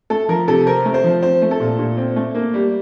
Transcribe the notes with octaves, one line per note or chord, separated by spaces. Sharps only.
A3 A4
F3 A#4
C3 A4
C4 A#4
A3
C5
F3
C4 C5
A3
A4
A#2
A#2
C4
A3
A#3
G3